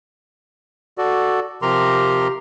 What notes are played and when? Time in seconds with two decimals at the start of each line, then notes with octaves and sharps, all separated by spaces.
0.98 F#4 A4 D5
1.62 C3 F3 G4 A#4 A#5 C6